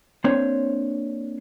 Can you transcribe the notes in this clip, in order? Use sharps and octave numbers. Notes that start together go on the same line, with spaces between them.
A#3 C4 D4 C5 C#5